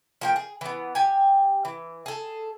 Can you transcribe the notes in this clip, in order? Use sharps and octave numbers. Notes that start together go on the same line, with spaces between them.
F3 A#3 G5
G#4
E3 B3
G4 G#5
E3
G#4 A4